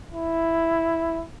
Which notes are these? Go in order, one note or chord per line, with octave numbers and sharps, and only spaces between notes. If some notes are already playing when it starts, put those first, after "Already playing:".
E4